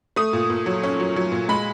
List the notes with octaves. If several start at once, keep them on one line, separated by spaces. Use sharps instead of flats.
A3 D#6
A#2
A#2
F#3
C#4
F#3
F#3
A#2
G#3 B5